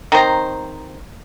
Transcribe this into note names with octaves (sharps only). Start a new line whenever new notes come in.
D#3 C4 C5 A#5